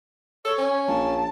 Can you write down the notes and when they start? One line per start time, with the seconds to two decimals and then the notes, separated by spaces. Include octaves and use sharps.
0.45 A4 C#5
0.58 C#4
0.88 A#1 A5